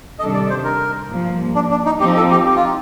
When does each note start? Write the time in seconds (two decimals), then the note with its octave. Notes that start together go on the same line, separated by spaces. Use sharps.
0.19 C3 D#3 G3 D4 A4 D#5
0.34 D5
0.50 C5
0.64 A#4
1.09 G2 F3 A#3
1.55 D4
1.71 D4
1.86 D#4
2.00 F3 C4 D#4 G4
2.16 A4
2.31 G4
2.46 G4
2.55 F4
2.64 D#4